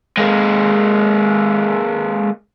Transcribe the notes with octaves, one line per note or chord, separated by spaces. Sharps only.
G#3 A#3